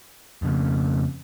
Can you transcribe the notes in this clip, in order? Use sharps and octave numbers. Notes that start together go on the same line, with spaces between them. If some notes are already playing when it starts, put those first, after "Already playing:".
F2 C#3